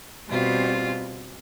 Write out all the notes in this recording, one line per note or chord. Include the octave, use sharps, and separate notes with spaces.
B2 G3 C4 F4